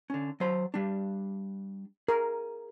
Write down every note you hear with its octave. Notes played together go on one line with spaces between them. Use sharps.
D3 C#4
F#3 C5 B5
G3 D4
G#4 A#4